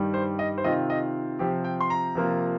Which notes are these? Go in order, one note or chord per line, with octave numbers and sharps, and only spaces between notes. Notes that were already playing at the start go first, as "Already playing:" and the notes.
Already playing: G2 D#3 G3
C5
D#5
C5
C3 D#3 C4 F4 D#5
D#5
C3 F3 C4 G4
G5
C6
A#5
C3 F3 A#3 F4